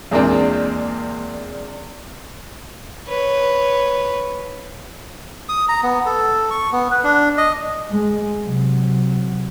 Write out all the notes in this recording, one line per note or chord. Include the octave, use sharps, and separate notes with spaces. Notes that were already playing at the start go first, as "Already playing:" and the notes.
E2 A#2 G#3 A#3 C4 D4
B4 C#5
D#6
A#5
B3
A4
C#6
B3
B4
D4
D#5
G#3
C3 F#3